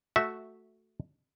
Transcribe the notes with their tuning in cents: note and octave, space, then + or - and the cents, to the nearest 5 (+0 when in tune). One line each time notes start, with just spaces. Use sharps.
A3 +0 F#4 +0 E5 -10